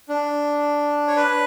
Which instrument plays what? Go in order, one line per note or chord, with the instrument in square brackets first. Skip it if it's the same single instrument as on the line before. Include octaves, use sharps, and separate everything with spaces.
[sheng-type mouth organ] D4
C#5
B4